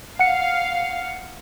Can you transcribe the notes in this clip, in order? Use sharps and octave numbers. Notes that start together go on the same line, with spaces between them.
F5 F#5 C#7